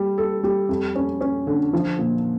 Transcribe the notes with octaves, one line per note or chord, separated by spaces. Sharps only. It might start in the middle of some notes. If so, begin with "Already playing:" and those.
Already playing: G3
A4
G3
F2
C#4
C#4
D3
F3
A#2